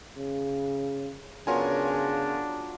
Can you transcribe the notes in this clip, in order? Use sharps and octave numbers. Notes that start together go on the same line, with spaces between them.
C#3
C#3 F#3 B3 D4 F4 F#4 A#4 G#5